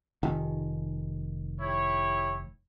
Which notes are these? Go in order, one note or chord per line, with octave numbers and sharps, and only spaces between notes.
F1 D#3
E4 G4 C#5